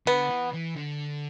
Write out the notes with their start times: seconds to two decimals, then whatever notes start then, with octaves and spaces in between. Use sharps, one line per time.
0.07 D3 B3
0.30 E3
0.53 E3
0.76 D3